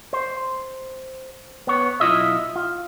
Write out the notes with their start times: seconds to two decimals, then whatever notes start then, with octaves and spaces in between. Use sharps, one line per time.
0.13 C5
1.67 B3 C#5
2.00 B1 G2 E4 F4 D#5 E5
2.56 F4